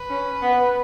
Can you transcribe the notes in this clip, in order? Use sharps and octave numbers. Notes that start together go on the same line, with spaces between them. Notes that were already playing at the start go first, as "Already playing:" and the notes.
Already playing: B4
C#4
B3